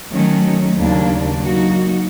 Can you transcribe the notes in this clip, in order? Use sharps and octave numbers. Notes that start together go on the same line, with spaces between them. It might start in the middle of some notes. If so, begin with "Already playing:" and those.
D#3 F#3 A3 C#4
D#2 C#3 F#3 A#3 D4
F#3 A#3 D#4 F#4